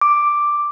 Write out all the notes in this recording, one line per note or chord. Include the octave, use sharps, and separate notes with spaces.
D6